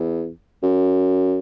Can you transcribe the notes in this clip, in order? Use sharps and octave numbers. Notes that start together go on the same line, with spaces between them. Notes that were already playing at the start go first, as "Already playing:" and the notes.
Already playing: E2
F#2